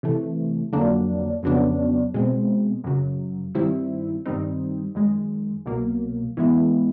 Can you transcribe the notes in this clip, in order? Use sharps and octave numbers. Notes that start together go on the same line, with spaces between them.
C3 E3 A3
F2 D3 F#3 A#3 D4
F2 C#3 F#3 B3 D4
B2 G#3 C4
F#2 C#3 F#3
G2 D#3 G3 C4 E4
G2 D#3 G3 C4 D#4
F#2 D#3 G#3
C2 B2 F#3 A#3
G#2 E3 G#3 B3 E4